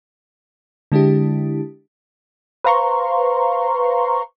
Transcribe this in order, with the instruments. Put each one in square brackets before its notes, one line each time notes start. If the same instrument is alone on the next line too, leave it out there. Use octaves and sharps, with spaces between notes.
[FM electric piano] D3 G#3 D4 E4 G4
[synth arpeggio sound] B4 C5 F5 A#5 C6 C#6